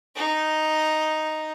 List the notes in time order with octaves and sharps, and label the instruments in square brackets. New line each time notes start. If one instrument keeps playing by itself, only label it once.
[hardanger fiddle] D#4